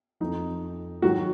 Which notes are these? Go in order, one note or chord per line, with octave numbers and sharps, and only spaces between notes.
F2 F3 D#4
G#2 D#3 F#3 F#4